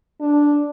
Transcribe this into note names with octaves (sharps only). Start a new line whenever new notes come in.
D4